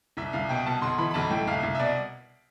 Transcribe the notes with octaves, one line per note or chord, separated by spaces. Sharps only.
C2 E5
C2 F5
B2 G5
B2 A5
B1 C6
E3 B5
B5
B1 A5
A2 G5
C2 F5
C2
E5
B2 D5